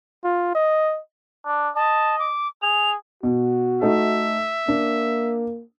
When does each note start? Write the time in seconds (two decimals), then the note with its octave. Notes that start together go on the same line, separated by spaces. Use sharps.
0.24 F4
0.55 D#5
1.46 D4
1.76 D#5 A5
2.19 D6
2.62 G#4 F7
3.23 B2 F#4
3.82 A3 D#4 A4 E5
4.68 A#3 D4